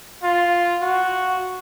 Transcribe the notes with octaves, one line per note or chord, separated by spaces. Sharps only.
F4
F#4